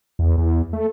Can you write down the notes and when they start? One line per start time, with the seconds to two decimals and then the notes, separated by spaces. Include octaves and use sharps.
0.19 E2
0.38 E2
0.73 A3